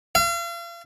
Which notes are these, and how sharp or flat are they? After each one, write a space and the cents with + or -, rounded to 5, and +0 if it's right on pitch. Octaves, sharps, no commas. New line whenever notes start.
F5 -40